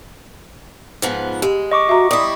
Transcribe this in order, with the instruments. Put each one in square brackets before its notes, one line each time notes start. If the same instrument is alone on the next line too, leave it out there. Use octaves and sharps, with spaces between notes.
[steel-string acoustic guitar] G#2 F3 B3
[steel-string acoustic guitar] G#3 [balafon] G4
[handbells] D#5 C#6 D6
[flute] F#4 [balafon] E5 A#5
[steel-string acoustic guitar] G3 E4 [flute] D#6